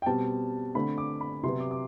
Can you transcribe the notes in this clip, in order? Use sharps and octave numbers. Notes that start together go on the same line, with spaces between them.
G5
B2 G3 C4 A5
D3 A3 C4 B5
D6
B5
C3 F#3 B3 C6
D6
D6